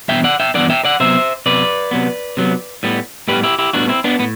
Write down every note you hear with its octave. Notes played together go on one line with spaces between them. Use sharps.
G2 E3 B3 E5 G5
D5 F#5
E5 G5
G2 E3 B3 D5 F#5
E5 G5
D5 F#5
C3 F#3 B3 C5 E5
C3 F#3 B3 B4 D5
C3 F#3 B3
C3 F#3 B3
A2 G3 B3
A2 G3 B3 G4 B4
E4 G4
E4 G4
A2 G3 B3 D4 F#4
C4 E4
B3 D4
A2 B3